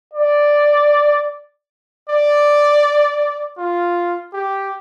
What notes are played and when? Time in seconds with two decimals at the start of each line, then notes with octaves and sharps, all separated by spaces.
0.13 D5
2.09 D5
3.58 F4
4.33 G4